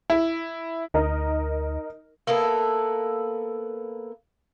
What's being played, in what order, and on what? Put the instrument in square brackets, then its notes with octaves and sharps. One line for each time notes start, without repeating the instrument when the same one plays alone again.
[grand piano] E4
[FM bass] D2 [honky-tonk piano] D#4 A#4 D#5
[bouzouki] A#3 B3 E4 A4